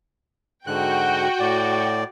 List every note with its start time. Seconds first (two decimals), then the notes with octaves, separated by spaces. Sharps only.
0.67 G#2 D3 F#4 G5 F#6
1.40 A2 D5